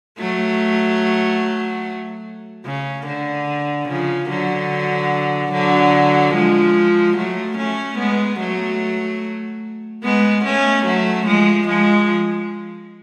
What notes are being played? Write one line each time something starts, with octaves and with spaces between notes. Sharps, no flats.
F#3 A3
C#3
D3
C#3 F3
D3 F#3
D3 F#3
F3 G#3
F#3 A3
A3 C#4
G#3 B3
F#3 A3
G#3 B3
A3 C#4
F#3 A3
F3 G#3
F3 G#3